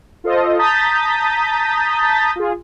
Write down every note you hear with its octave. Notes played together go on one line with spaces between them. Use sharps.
F4 A4 C5 D#5
A5 A#5 D#6 G6 A6 B6
F4 G#4